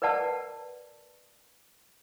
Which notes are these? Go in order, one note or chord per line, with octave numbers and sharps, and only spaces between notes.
A#4 B4 D5 F#5 A5